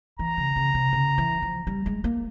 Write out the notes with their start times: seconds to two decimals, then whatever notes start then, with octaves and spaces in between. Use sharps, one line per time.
0.19 E3 A#5
0.38 C#3
0.56 C#3
0.74 C3
0.93 C#3
1.18 E3
1.42 F3
1.67 G3
1.86 G#3
2.04 A#3